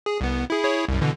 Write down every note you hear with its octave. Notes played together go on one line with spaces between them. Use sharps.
G#4
C2 B3
E4 G#4
E4 G#4 C#5
C2 F#2
B2 D3 E3